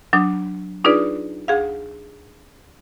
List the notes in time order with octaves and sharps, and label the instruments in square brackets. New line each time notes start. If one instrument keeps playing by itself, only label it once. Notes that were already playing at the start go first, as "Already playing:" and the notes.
[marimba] F#3 D4 D#6
D4 D#4 F4 G#4 B4 D5
D2 G#4 F5